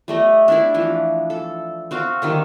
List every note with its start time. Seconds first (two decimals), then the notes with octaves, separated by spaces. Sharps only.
0.08 G3 A3 D#5
0.48 D4 E4 D5
0.74 E3 F3
1.30 A4
1.91 C4 F#4 F5
2.22 D3 D#3 G3